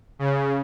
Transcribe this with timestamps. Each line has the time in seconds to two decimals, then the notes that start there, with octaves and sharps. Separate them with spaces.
0.19 C#3